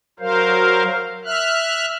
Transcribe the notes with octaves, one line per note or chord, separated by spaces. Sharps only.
F#3 A#4 C5 F5
E5 F6 F#6